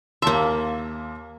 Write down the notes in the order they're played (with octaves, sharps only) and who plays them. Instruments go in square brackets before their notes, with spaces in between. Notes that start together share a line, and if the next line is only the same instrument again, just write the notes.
[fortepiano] D#2 A5 C6 [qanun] A#3 E5